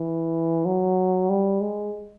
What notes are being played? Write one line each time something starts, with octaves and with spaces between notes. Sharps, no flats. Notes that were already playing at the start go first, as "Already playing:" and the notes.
Already playing: E3
F#3
G3
G#3